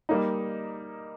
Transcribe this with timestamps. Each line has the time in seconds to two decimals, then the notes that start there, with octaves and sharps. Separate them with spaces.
0.09 G3 A#3 D#4